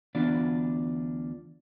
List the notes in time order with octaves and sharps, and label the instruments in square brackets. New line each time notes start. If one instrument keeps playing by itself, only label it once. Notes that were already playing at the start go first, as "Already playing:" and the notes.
[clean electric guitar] D2 E3 B3 D4 F4 D5